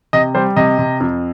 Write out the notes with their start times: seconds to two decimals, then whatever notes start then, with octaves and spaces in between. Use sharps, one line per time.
0.13 C3 D#5
0.35 G3 C5
0.56 C3 D#5
0.79 C3
1.00 F2